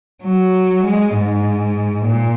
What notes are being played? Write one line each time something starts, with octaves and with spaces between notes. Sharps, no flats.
F#3
G#3
G#2
A#2